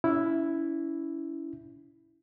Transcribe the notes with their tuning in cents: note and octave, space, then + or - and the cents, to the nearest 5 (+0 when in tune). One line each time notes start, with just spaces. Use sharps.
C#4 +35 E4 +0